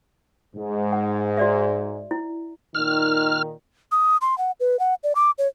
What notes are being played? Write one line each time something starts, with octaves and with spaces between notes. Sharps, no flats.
G#2
F#5
F#4 D5 E5
E4
A#2 D#3 F6
D#6
C6
F#5
B4
F#5
D5
D6
C#5